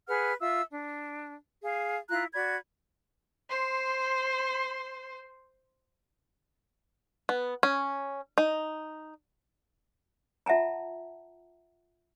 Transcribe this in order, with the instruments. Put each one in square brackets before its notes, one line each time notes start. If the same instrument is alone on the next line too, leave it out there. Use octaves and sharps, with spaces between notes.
[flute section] G#4 B4 F#5 F6
F4 E5 E6
D4
G#4 F5
E4 F4 A#5 F#6
F#4 D5 B5 G#6
[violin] C5 C6
[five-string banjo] B3
C#4
D#4
[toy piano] F4 E5 F#5 A5 A#5